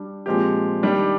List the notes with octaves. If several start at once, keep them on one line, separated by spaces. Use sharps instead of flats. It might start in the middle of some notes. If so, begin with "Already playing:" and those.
Already playing: G3 D4 G4
A#2 F3 G#3 C4 G4
D#3 G3 D4 G4